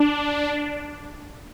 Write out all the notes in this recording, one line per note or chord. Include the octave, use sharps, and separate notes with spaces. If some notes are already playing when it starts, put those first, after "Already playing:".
Already playing: D4